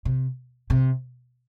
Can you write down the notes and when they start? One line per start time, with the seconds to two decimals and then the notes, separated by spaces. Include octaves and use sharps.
0.05 C3
0.70 C3